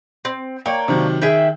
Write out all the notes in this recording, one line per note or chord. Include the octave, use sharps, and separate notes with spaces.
C4
A#3 D4 C#5 G5
C3 D#3 F#3
D#3 G#4 E5 G5